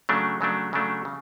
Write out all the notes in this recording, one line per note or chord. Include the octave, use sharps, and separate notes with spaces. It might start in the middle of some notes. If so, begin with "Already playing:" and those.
C#3 F#3 A3 D4
C#3 F#3 A3 D4
C#3 F#3 A3 D4
C#3